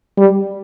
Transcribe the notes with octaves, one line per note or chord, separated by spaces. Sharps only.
G3